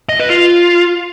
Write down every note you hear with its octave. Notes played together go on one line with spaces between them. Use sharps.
D#5
B4
F4